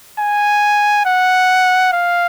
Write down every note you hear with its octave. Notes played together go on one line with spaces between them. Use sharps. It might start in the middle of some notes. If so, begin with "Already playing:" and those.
G#5
F#5
F5